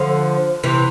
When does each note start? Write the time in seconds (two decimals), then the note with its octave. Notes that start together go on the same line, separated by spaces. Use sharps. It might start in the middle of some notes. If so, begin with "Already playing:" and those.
Already playing: D3 F3
0.63 C3 E3